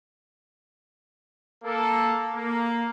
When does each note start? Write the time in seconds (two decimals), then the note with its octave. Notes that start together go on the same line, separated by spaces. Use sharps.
1.64 A#3 A4
2.34 A#3